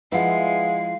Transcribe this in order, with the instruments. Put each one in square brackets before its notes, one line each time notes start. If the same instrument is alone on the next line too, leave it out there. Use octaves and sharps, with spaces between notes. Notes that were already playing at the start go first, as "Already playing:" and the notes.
[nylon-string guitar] F3 E4 [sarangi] G#3 [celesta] B4 F#5 [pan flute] F5